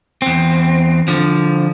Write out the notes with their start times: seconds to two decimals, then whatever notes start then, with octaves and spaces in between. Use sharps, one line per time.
0.22 E2 C4
1.08 D3 F3